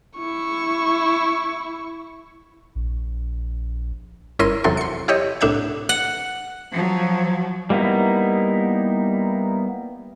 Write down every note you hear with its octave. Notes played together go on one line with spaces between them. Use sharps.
E4 C#6
A#1
G1 C#4 E4 A#4 C6 D#7
E2 C3 E3 F#3 A4 C6
C6 C#7
E4 G4 C#5 D#5
C2 A2 D4 E5 F#5 G6
F#5
F3 F#3
G3 A#3 B3 D#4 E4